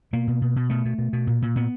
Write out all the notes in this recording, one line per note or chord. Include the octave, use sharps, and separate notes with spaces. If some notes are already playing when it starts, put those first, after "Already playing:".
B2 A#3
B2
B2
B2
B2 A3
B2
B2
B2
A#2
A#2
A#2 B3